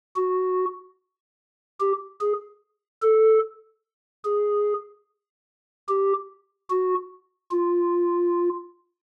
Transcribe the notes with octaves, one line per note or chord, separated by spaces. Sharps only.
F#4
G4
G#4
A4
G#4
G4
F#4
F4